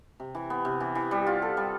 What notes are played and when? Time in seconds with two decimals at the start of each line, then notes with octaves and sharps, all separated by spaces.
0.20 C3
0.35 E3
0.50 B3
0.65 C3
0.80 E3
0.95 E3
1.11 G3
1.27 F4
1.42 A4
1.57 G3